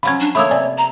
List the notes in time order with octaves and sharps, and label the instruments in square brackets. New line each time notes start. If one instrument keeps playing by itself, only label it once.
[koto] F3 F#3 C#4 [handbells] B5 G#6
[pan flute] D4
[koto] A3 A#3 [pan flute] C#5 [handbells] B5 D#6 E6
[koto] C3 [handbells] D5 G#5
[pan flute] A#5